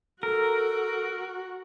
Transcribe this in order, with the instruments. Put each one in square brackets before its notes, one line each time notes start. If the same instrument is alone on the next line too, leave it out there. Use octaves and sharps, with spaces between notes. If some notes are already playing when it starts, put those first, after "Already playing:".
[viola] F#4 [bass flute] A4 [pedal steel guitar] A#4